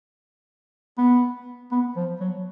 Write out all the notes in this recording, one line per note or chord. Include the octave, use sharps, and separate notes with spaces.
B3
B3
F3
F#3